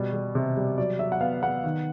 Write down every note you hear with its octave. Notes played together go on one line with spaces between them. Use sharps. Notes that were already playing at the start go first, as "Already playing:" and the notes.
Already playing: B2 G3
G3
C3
G3
F#3 D5
F#3 E5
F#5
B3 F5
B3 F#5
D#3